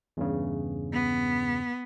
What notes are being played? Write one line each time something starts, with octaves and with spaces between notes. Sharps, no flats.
E2 G2 C#3
B3